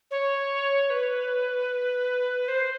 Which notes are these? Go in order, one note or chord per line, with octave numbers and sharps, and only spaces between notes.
C#5
B4
C5